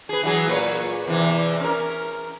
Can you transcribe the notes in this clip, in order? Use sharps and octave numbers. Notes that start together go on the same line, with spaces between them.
G#4 B4
E3 F#3 G#4
A#2 B4 C#5
E2 C3 E3
C#4 A#4